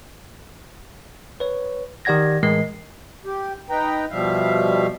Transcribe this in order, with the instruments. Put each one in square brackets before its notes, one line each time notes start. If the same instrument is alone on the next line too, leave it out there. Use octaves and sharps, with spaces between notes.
[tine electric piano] B4 C#5
D#3 G4 D5 F#5 G#6 A#6
A2 E3 G#3 A#4 D#5 C7
[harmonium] G4
D#4 B4 G5 A#5
B2 F3 G3 E5 F5